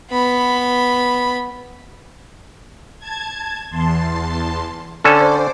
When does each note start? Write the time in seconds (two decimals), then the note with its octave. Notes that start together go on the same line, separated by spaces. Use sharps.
0.11 B3 B5
2.99 A5 G#6
3.70 E2 A5 C6
5.04 D3 C#4 A4 C5 D5